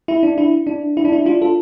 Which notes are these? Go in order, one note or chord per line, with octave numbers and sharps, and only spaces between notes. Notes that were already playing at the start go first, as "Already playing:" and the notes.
E4
D4
E4
D4
E4
D4
E4
D4 F4
F4 A4